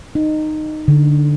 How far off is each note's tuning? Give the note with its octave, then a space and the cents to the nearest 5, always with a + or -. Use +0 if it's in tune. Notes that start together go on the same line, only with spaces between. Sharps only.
D#4 -15
D3 +0